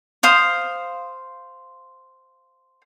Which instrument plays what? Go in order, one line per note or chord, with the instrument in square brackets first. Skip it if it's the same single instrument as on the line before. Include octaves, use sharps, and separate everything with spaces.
[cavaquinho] C5 F5 D#6